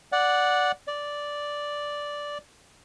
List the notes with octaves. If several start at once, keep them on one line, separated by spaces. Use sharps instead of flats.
D5 F#5
D5